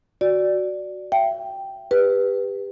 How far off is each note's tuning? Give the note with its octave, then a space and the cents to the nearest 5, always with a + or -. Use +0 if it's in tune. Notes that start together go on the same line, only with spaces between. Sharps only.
F#4 +0 D5 +0
E5 +35 G5 +0
G4 +25 B4 +0